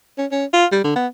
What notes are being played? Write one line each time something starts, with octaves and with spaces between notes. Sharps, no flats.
C#4
C#4
F4
G3
D3
B3